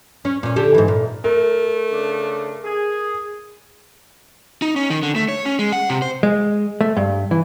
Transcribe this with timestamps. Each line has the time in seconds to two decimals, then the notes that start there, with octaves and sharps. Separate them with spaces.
0.25 C#4
0.43 A#2 C#4
0.56 D3 G4 A4
0.74 G#2 E3
0.88 A#2
1.24 A3 A#4
1.92 C#3 D4
2.65 G#4
4.62 D#4
4.76 C#4
4.90 D#3
5.03 D3
5.16 A3
5.29 C#5
5.46 C#4
5.59 G#3
5.72 F#5
5.90 C3
6.02 C5
6.23 G#3
6.81 A3
6.97 G2
7.31 E3